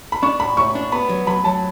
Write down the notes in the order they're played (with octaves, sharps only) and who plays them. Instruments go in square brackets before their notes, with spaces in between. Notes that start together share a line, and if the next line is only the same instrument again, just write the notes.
[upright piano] B5
[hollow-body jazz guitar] D4 [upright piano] C#6
[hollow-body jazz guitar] A2 [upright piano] B5
[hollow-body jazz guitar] A2 [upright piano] C#6
[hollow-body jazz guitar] D4
[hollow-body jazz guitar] B3 [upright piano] B5
[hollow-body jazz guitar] F#3
[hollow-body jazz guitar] F#3 [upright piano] B5
[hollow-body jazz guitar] F#3 [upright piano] A5